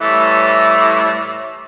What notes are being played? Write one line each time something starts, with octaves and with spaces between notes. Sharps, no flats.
A2 E3 G3 A4